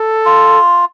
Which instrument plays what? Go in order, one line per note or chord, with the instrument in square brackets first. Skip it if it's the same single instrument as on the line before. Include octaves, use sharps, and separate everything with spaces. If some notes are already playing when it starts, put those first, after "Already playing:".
Already playing: [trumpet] A4
[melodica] F4